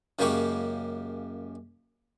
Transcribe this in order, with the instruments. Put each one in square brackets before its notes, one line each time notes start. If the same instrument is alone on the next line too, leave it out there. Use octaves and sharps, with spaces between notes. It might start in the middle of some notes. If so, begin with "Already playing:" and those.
[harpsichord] F#2 C#3 G#3 A#3 G4 C#6